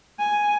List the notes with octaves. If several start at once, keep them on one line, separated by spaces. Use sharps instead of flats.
G#5